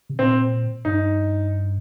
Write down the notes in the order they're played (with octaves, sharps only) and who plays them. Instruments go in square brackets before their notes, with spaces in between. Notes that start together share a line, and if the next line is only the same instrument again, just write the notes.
[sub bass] C3
[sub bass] A#2 [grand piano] C4
[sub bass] G2 [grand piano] D#4